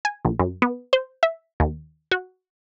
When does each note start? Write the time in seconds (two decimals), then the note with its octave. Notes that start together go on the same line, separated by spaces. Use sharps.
0.05 G#5
0.25 A#1
0.39 F#2
0.62 B3
0.93 C5
1.23 E5
1.60 D#2
2.12 F#4